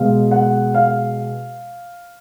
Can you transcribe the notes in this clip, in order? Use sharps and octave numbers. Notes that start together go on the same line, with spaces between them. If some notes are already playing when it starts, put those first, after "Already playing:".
Already playing: B2 G#3 F5
F#5
F5